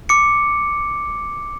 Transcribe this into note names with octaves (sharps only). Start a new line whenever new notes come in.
D6 C#7